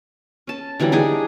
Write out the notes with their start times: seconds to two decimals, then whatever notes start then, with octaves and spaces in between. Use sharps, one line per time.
0.47 C#4 A5
0.80 D3 E3 F#3 G3
0.92 D4 D#4 G4 G#4